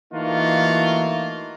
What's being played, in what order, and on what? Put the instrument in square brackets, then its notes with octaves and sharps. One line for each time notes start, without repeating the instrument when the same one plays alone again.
[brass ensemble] E3 A3 A#3 D#4 F4 F#4